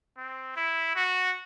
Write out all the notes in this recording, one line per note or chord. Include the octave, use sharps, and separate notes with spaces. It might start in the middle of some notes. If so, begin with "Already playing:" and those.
C4
E4
F#4